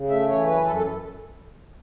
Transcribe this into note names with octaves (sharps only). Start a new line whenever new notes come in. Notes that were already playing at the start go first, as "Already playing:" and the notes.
Already playing: C#3
A3 E5
E3 C#5
F#2 B4
F#2 A4
A4